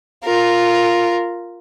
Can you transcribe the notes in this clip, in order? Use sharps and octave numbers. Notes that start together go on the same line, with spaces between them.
F4 A#4